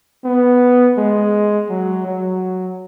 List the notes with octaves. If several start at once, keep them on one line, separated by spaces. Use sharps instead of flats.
B3
G#3
F#3
F#3